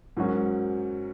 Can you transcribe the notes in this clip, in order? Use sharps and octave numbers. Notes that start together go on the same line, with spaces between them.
G#2 F#3 C#4 F#4 A#4